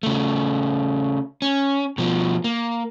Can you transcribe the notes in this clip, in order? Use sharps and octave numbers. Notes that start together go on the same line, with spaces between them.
C#3 A3
C#4
B2 F3
A#3